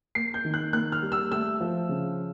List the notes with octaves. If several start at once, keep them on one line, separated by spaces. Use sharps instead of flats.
A#3 C7
G6
D#3
F#6
A#3 F#6
F6
G3
E6
A3 E6
F3
C#3